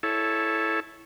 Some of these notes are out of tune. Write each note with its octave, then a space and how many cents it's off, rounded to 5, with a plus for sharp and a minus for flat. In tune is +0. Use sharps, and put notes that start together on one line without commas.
E4 +0 A4 -15 C#5 +0